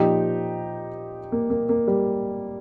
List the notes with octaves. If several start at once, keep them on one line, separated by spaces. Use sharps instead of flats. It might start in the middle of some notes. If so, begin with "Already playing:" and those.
Already playing: A#2 F3 D#4 G4
A#3
A#3
A#3
G3